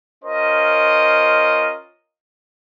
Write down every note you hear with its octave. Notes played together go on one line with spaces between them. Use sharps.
C#4 F4 A#4 C5 D#5